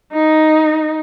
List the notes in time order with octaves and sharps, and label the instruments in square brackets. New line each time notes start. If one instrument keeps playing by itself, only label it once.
[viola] D#4